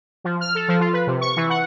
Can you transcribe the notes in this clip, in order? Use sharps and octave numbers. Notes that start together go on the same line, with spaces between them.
F3
F6
A4
F3
F4
B4
C3
C#6
E3
F#5